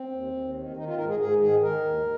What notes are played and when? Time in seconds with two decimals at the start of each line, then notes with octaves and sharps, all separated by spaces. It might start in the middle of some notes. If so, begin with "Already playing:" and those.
Already playing: C4
0.12 D#2
0.34 D#2
0.55 D#3
0.77 D#3 D#4
0.87 F4
0.98 G#2 A#4
1.09 G#4
1.19 G#2 G#4
1.40 D#3 G#4
1.61 D#3 A#4
1.84 D#2